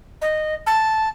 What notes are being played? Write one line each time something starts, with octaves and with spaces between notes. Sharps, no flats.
D#5
A5